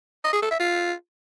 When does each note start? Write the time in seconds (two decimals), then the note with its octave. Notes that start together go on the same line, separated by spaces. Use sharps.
0.24 D#5
0.33 G#4
0.42 A4
0.51 E5
0.60 F4